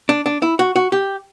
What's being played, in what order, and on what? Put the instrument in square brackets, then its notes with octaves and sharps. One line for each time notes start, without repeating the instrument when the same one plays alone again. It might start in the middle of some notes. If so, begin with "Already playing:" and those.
[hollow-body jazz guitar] D4
D4
E4
F#4
F#4
G4